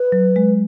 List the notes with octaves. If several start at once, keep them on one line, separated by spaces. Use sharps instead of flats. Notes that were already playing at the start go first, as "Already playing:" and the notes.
Already playing: B4
F#3
G#3